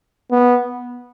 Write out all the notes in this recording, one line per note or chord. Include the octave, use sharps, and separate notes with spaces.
B3